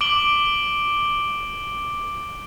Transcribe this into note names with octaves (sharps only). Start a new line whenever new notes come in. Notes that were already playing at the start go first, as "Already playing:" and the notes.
D6 D7 F#7 G7